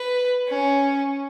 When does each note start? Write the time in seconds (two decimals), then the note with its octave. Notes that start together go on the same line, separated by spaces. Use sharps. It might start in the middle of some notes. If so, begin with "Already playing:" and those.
Already playing: B4
0.48 C#4